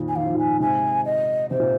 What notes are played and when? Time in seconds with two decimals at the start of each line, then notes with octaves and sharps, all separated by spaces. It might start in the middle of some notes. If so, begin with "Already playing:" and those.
Already playing: F2 A#2 D#3
0.08 G#5
0.16 D#3 F5
0.25 F3
0.35 A#2 D#3 G#5
0.60 G#2 C3 G#5
1.06 D#5
1.50 C3 C5
1.60 A#2